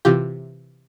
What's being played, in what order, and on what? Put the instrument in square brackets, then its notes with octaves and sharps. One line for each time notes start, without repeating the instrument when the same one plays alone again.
[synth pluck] C3 E3 F4 G4